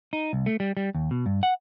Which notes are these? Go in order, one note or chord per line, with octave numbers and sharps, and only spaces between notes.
D#4
C2
A3
G3
G3
D#2
B2
G2
F#5